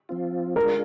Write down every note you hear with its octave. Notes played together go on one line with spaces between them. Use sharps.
F3 C4 F4
G#3 D4 F4 G#4 A#4